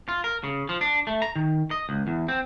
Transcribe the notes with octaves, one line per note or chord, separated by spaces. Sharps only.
F4
A#4
C#3
F3
D4
A3
A#5
D#3
D#5
C#2
E2
C4